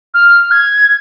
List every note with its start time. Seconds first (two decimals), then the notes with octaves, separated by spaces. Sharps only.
0.14 F6
0.51 G#6